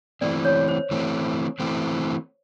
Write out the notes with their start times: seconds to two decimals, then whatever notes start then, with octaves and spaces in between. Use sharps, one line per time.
0.21 E3 A3 C4 D5
0.45 C#5
0.68 C5
0.91 E3 A3 C4
1.60 E3 A3 C4